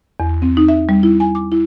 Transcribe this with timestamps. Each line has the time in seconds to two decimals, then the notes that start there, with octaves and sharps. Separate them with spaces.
0.20 E2
0.42 C4
0.57 D#4
0.68 E5
0.89 G3
1.03 E4
1.20 G#5
1.35 D6
1.52 E4